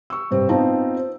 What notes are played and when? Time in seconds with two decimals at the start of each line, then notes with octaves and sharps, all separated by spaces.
0.10 C#6 E6
0.31 G2 C3 C4
0.49 B3 C4 D#4 F4 A5 A#5
0.96 C5